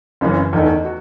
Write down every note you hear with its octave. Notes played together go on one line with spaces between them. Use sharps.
F#1 F#2 C#3 E3
E2 D#3 A3 D#4
F#4